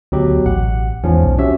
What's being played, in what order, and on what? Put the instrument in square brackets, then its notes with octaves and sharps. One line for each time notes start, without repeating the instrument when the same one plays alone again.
[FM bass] D2 [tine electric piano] B2 F#3 G4
[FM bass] A1 [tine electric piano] F#5
[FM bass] E2 [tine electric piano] G#2 F3 C#4
[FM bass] B1
[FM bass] C#4 [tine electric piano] F#4 G4 E5